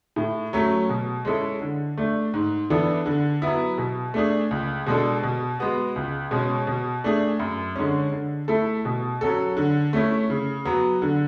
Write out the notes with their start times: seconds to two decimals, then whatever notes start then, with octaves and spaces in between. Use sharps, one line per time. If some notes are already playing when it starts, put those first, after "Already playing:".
0.16 A2
0.53 F#3 A3 C#4
0.89 B2
1.25 G#3 C#4 E4 A4
1.61 D3
1.97 A3 D4
2.34 G#2
2.70 E3 B3 D4 A4
3.06 D3
3.42 F#3 B3 E4
3.78 B2
4.14 A3 D4 G#4
4.51 C#2
4.86 B2 G#3 D4 A4
5.23 B2
5.59 G#3 B3 F#4
5.96 C#2
6.31 B2 G#3 C#4
6.67 B2
7.04 A3 D4 G#4
7.39 F#2
7.76 D3 G#3 C#4
8.12 D3
8.48 A3 E4 A4
8.85 B2
9.21 F#3 C#4 F#4 A4
9.57 D3
9.93 A3 C#4 E4
10.30 C#3
10.65 F#3 B3 F#4
11.02 D3